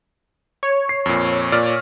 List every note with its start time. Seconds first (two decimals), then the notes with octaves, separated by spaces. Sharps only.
0.63 C#5
0.89 C7
1.06 F2 A#2
1.52 A#2 D5 F6